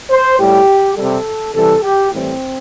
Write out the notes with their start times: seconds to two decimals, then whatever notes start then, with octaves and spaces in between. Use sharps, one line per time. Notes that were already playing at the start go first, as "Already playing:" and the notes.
0.10 C5
0.39 A2 G3 G4
0.96 C3 G3 A4
1.54 C3 E3 G3 A4
1.83 G4
2.12 A2 E3 G3 C4